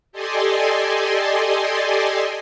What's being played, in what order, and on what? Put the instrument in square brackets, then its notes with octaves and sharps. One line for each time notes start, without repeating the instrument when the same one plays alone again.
[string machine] G4 A4 D5 D#5 G#5 C6